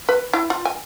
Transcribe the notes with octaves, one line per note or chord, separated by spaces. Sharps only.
B4
E4
F4
G#5